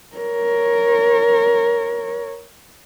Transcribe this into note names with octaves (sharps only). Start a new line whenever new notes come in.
A#4 C#5